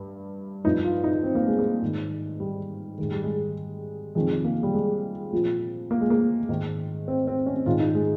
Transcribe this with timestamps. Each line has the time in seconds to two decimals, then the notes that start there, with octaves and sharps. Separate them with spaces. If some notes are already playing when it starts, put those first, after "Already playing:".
Already playing: G2
0.64 G2 F3 D#4
0.84 F4
1.04 D#4
1.23 C4
1.35 A#3
1.47 G#3
1.59 A#3
1.82 G#2 D#3
2.40 G3
2.98 G#2 D#3 G#3
3.11 G3
3.24 G#3
4.15 F2 C3 D#3 G#3
4.44 A#3
4.63 G3
4.74 G#3
5.32 A#2 F3
5.91 A#3
6.01 G#3
6.10 A#3
6.49 G#2 D#3
7.08 C4
7.27 C4
7.46 C#4
7.66 G#2 D#3 F4
7.80 D#4
7.95 G#3